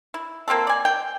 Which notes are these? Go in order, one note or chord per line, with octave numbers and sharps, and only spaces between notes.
E4
A#3 C4 F4 A4
D5 G#5
G5